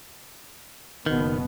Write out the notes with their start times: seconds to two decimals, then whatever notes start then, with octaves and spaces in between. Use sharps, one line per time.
1.06 F#1 B2 D#3 B3